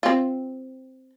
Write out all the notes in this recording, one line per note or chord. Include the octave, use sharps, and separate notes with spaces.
C4 F4